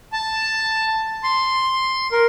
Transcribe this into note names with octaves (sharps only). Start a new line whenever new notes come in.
A5
C6
A#4